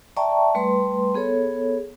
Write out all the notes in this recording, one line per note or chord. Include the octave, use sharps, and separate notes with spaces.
D5 E5 G5 A5 A#5 C#6
G3 A3 B4 C6
B3 G#4 A4 C#5